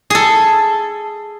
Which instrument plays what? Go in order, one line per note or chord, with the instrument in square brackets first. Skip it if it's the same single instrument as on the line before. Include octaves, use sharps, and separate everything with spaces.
[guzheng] G#4 A4